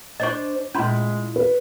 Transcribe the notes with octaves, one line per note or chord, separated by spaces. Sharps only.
D4 C5 D5 D#5 C#6
A#2 G#3 C#4 E4 B5 C6
B4